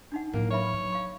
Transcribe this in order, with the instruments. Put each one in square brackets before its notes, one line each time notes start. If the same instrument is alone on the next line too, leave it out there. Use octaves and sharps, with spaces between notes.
[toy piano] D4 D#4 F#5
[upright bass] A2 F#3 [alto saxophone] A#3
[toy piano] B4 E5 B5 [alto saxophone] C#5
[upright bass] F#3
[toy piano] F5 C#6